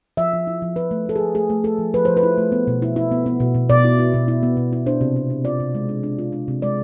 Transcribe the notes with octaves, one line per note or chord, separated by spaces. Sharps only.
F3 E5
F3
E4
F3
F3 B4
A3
A3 A4
G#4
F3
A3 G#4
A3
A3 A4
F3
F3 B4
F3 C5
B4
E4
A3
B3
B2
E4
E4
B3
B3
B2
B2
B2 D5
E4
E4
B2
E4
B3
B2
E4
D4 C5
C3
D4
D4
F4 D5
C3
G#3
D4
D4
F4
D4
C3
G#3 D5